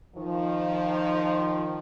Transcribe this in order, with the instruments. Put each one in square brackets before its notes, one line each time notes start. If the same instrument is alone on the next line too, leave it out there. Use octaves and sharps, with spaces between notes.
[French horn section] D#3 F3